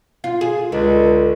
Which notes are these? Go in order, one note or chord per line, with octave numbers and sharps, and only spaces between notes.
F4
G#4
C#2 D3